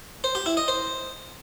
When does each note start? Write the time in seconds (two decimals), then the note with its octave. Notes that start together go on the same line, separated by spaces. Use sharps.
0.24 C5
0.35 G4
0.46 E4
0.57 D#5
0.68 C5